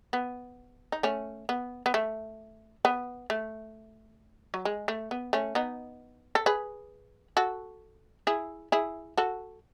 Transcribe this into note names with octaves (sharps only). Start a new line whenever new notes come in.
B3
D#4
A3 C#4
B3
B3
A3
B3
A3
F#3
G#3
A3
B3
A3 C#4
B3 D#4
A4
G#4 B4
F#4 A4
E4 G#4
E4 G#4
F#4 A4